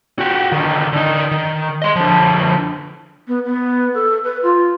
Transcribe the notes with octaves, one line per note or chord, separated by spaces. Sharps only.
F#4 G4
D3 D#3
D3 D#4
D#3
D#5 C6
D3 F3
B3
B3
A4
B4
F4